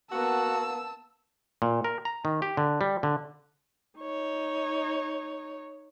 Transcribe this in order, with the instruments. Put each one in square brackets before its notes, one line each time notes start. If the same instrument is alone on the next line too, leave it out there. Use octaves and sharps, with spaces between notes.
[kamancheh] A#3 B3 [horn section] F#4 [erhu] A5 [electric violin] E6
[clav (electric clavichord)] A#2
A#4
A#5
D#3
G4
D3
G3
D3
[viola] D#4 C#5